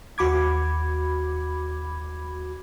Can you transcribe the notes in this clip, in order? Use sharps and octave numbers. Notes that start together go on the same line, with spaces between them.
D#2 F#4 B5 D6 G#6